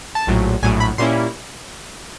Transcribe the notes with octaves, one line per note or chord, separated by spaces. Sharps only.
A5
A#1 A2 F#3
A#1 A2 F#3 G#5
B5
A#2 G3 A#3 C#4 E4 C6